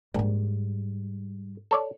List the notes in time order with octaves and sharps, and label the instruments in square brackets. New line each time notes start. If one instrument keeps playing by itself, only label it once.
[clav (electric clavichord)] A#1 [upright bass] G#2 G3
[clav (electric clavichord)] A4 C#5 D5